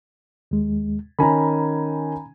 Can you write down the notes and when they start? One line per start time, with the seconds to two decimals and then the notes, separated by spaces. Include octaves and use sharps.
0.51 D#2 G#3
1.19 D#3 C#4 G#5 A#5 B5